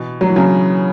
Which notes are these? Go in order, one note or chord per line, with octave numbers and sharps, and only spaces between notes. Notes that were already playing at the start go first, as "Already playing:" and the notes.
Already playing: B2 E3
F#3
E3
C#3 F#3